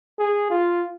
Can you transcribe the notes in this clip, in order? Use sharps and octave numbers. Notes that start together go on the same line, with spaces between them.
G#4
F4